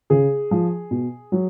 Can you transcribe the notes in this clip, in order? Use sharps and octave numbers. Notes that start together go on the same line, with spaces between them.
C#3 G#4
F3
B2
F#3